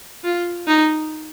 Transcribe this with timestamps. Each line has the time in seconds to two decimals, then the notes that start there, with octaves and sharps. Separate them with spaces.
0.24 F4
0.67 D#4